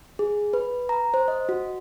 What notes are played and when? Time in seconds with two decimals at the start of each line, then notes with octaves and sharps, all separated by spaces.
0.19 G#4
0.53 B4
0.89 A#5
1.14 C5
1.28 D#5
1.49 F#4